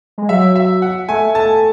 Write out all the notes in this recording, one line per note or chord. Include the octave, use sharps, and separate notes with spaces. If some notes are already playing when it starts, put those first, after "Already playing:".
G#3
F#3 E5
E5
F#5
A3 G#5
A5